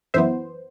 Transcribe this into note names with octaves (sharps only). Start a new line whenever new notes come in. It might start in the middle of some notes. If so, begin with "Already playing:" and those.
F#2 E3 B3 C5 E5